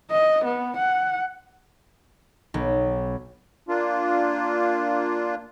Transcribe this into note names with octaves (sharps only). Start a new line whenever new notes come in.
D#5
B3
F#5
B1
A#3 D4 F4